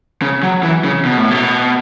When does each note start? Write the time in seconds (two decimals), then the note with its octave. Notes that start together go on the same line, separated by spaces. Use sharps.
0.22 C#3
0.43 F#3
0.63 E3
0.84 C#3
1.05 B2
1.17 A2
1.31 B2